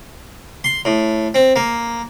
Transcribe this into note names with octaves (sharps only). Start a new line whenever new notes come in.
C6
A2
C4
A#3